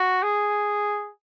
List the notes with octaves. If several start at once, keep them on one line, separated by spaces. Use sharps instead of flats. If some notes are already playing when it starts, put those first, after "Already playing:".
Already playing: F#4
G#4